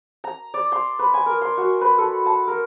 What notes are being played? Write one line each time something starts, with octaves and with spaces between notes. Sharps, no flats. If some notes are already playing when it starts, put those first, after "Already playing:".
A#5
D5
C6
B4
G#5
A#4
C6
F#4
B4
A4
A5
A#4